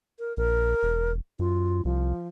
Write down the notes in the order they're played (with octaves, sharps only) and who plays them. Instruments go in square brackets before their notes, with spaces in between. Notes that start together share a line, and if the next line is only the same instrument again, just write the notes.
[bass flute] A#4
[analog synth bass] A#1 [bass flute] A#4
[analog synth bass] E1
[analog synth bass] F#2 [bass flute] F4
[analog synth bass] C2 [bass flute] F3